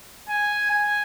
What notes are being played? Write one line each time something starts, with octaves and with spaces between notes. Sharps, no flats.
G#5
G#5